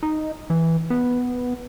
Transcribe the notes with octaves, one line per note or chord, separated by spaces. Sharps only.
D#4
E3
B3